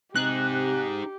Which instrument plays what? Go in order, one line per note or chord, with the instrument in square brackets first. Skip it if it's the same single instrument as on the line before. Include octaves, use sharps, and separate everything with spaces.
[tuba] C3 [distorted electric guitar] D#4 G#4 [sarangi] G4 [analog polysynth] F#6